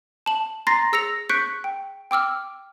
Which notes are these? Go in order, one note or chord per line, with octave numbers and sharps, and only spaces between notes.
A5 F#7
A#5 C6 A6 A#6 C7
G#4 E6 A#6 C#7 F7
C#6 F#6 G6 B6 C#7 D7
G5
G5 D6 E6 F6